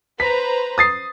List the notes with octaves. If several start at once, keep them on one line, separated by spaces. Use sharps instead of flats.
B4 C5 A#5 B6
D#6 A6 C7